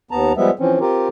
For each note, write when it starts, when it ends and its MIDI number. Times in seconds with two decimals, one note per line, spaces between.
0.11 0.33 39
0.11 0.33 59
0.11 0.33 81
0.11 0.33 82
0.37 0.51 53
0.37 0.51 55
0.37 0.51 56
0.37 0.51 59
0.37 0.51 76
0.59 0.80 52
0.59 0.80 53
0.59 0.80 60
0.59 0.80 61
0.80 1.08 60
0.80 1.08 65
0.80 1.08 67
0.80 1.08 70